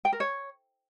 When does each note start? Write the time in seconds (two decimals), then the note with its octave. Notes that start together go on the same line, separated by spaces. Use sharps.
0.05 G5
0.12 A#4
0.20 C#5